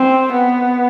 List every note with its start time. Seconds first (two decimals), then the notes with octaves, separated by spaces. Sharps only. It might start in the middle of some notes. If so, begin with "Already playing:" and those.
Already playing: C4
0.32 B3